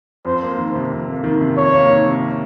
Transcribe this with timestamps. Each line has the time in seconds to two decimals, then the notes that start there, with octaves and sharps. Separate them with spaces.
0.25 F2 C5
0.43 A#3
0.58 D#3
0.75 C3
0.92 F2
1.08 A#3
1.24 D#3
1.41 C3
1.57 F2 C#5
1.74 A#3
1.90 D#3
2.06 C3